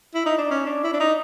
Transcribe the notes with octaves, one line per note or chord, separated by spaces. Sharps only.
E4
D#4
D4
C#4
D4
E4
D4
D#4